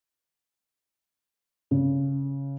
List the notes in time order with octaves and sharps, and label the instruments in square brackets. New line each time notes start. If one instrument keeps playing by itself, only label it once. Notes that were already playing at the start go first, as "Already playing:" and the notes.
[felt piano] C#3